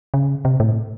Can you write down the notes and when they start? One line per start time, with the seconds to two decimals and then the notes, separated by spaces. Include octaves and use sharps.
0.14 C#3
0.45 C3
0.60 A2